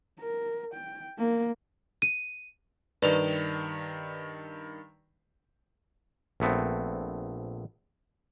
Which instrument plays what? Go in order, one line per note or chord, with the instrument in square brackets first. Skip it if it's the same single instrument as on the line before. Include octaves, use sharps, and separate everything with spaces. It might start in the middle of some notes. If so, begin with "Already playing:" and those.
[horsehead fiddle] A#4
G5
A#3
[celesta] D#7
[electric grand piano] G2 D#3 [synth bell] B4 D5 F7
[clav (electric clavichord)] A#1 A3 B3 C4